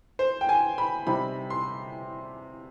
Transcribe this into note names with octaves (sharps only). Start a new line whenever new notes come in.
C5
G5
G#5
B5
C3 G3 C4 D#4 B5
C6